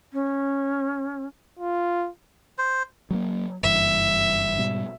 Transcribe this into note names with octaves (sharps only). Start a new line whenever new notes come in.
C#4
F4
C5
F#3 G#3 A#3
F#1 G2 E3 E5
G#2 B2 G3